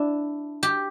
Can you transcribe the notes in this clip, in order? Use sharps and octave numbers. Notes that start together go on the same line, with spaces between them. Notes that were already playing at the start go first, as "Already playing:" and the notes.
Already playing: D4 E4
G4